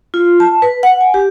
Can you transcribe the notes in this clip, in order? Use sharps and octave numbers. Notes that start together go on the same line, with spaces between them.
F4
A5
B4
F#5
G#5
G4